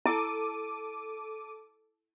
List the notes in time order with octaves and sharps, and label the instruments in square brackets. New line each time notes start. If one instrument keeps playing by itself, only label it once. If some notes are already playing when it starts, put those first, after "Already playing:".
[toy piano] E4 [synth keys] A4 D6 D#7